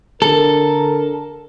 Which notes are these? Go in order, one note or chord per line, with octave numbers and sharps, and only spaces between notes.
D3 A4 A#4